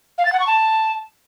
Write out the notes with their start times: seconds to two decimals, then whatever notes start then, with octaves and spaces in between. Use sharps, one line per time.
0.18 F5
0.25 A6
0.33 F#5
0.40 C#6
0.47 A5